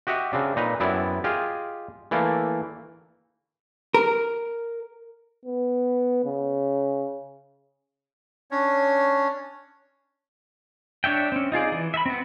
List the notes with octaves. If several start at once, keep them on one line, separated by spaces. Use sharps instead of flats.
F#4 G4 D#5 E5 F#5
C#3 C4 D4
A#2 D#4 B4 A#5
F#2 B3 C4 E4 D5
F4 G4 G#4 D#5
E3 A3 A#3 D5
A#4
B3
C#3
C#4 D4 C#5
D4 C#5 E5 G5
C4 C#4
D#4 F4 G#4 D5
E3
E5 B5
B3 C4